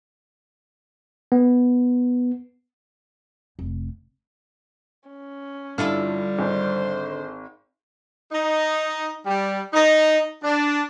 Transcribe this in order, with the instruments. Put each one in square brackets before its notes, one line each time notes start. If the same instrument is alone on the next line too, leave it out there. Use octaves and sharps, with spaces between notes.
[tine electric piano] B3
[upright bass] F1
[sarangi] C#4
[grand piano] G2 E4 F6 [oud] D3 F4 A4 [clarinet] G3
[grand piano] G#1 [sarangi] C5
[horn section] D#4
G3
D#4
D4